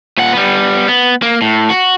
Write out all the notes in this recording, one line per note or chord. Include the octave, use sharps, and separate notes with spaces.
A#2 F#5
G3 B3
B3
A#3
A2
F#4